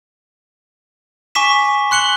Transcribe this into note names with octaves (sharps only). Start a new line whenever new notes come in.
G#5 C#6 D6 B6 E7
C6 F#6 C#7 F#7 G7